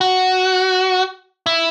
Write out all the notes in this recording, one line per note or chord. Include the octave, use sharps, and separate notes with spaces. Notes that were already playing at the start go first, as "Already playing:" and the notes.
F#4
E4